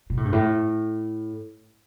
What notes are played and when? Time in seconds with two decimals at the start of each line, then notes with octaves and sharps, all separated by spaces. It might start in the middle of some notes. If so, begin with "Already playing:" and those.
0.10 B2
0.17 A2
0.25 G2
0.33 A2